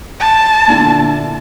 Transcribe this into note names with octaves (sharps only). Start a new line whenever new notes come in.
A5
A#2 D3 E4